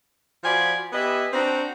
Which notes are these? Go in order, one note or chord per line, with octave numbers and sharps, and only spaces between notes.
F3 F#4 D5 G#5 B5 C6
B3 G4 B4 D#5 E5 G#5
C4 D4 F#4 F#5 G5 A#5